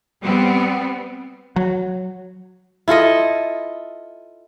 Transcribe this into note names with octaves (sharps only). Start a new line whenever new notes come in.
G3 B3 C4
F#3
E4 F4 A4 D#5